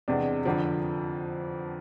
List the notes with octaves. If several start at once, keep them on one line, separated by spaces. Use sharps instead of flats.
E2 C3 G#3 D4
F2 D3 F3